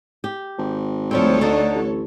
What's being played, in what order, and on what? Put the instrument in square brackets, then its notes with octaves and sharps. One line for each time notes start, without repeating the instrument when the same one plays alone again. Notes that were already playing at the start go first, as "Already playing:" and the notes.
[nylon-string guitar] G4
[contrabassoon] G#1
[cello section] D2 A4 C#5 [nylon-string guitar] F3 G3 C4
[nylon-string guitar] D3 D4 D#4
[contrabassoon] A1